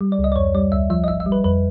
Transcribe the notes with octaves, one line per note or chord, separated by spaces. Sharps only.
G3
D5
C#2
D#5
D5
F2 C#5
G3 D5
D2 E5
F3 E5
D#5
G#1 E5
E5
G3
B4
F2 B4